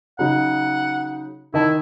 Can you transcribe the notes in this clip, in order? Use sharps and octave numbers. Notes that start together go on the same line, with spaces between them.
C#3 F#3 D#4 F#5
D#3 E4 D#5 A5